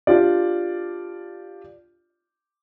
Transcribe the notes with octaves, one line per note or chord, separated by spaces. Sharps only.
D4 F4 G4 D5